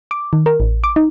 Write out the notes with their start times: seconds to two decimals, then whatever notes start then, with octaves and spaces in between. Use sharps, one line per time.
0.11 D6
0.33 D#3
0.46 A#4
0.60 A1
0.84 D6
0.96 D#4